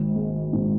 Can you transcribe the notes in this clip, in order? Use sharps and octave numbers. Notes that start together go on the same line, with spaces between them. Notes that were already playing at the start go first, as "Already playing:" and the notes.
Already playing: G#1
G#3
G#2